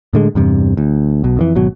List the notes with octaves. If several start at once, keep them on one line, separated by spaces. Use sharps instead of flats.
A2 D3 G#3
E2 G2 C3
D2
B1 B2
F2 D3 E3
G#1 B2 F#3